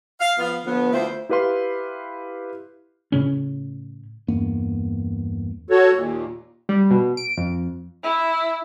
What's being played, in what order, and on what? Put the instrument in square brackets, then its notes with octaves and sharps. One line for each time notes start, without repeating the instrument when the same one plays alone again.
[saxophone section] F5
F3 B3 F5
D3 F3 B3
D2 E4 F4 C5
[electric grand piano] E4 G4 B4 F5 C6
[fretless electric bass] A2 C#3 C#4
[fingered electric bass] E2 G2 A#3 B3
[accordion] F#4 A4 C#5
D#2 A#2
[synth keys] G3
B2
D7
F2
[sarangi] E4